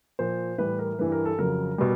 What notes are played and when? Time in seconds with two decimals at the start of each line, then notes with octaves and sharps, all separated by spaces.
0.19 A#2 F3 C5
0.58 A2 E3 G3 B4
0.79 A#4
0.99 G2 E3 G3 B4
1.12 A#4
1.25 A4
1.38 F2 C#3 F#3 A#4
1.78 B2 G3